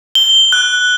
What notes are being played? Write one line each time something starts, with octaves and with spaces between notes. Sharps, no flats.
G7
F#6